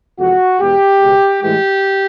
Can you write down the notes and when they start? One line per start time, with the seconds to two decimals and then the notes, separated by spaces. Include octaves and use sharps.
0.19 F2 C3 E3 G#3 F#4
0.59 E2 B2 G#3 G4
1.00 C#2 B2 G#3
1.41 A2 E3 G#3 G4